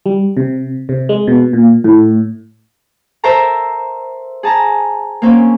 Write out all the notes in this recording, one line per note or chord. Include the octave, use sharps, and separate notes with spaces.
G3
C3
C3
G#3
B2
A#2
A2
A4 A#4 C5 E5 A5 A#5
G#4 A5 A#5
A#3 C4 C#4